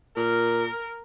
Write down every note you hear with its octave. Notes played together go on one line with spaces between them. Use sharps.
A#2 A#4